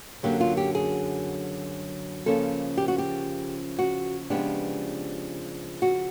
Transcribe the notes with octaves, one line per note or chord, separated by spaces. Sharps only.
F#2 D3 F#3 A#3 G4
F4
G4
G#4
C#3 F3 A#3 C#4 A4
G4
F#4
G4
F#4
C#3 F3 G#3 B3 D4 G4
F#4